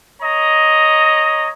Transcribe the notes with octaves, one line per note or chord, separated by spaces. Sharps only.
C#5 D#5 A#5